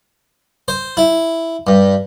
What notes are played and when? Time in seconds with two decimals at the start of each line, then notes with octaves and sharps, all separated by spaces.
0.68 C5
0.97 E4
1.67 G2